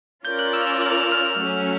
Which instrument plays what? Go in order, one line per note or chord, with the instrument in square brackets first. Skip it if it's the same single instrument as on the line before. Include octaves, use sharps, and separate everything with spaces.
[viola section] C#4 F4 A#4 D5 [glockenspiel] G6 G7
[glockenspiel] F#6 F#7
E6 E7
F7
E6 E7
F#7
F7
E7
F6 F7
[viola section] F#3 A3 C#4